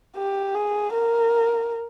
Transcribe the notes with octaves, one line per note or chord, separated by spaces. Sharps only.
G4
G#4
A#4